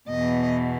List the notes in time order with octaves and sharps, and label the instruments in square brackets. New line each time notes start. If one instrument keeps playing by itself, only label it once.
[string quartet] E2 B2 D#5